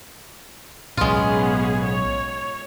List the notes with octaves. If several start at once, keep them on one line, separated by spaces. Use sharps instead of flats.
B1 A2 G#3 B3 C#4 F4 G#4
C#5